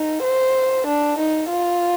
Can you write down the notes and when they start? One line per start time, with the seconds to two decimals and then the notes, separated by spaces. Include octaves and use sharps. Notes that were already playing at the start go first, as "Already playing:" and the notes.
Already playing: D#4
0.24 C5
0.87 D4
1.19 D#4
1.50 F4